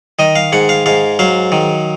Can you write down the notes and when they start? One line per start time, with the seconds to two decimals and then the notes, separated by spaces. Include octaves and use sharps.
0.19 D#3 D#5
0.36 F5
0.52 G#2 F#5
0.69 F5
0.86 G#2 F5
1.19 F#3 F5
1.52 D#3